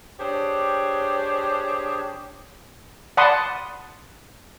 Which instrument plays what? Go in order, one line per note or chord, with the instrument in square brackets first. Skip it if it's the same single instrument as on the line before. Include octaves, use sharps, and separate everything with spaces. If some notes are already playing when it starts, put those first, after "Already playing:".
[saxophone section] D4 G4 G#4 C5 C#5
[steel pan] D5 F#5 A5 B5 C6 D#6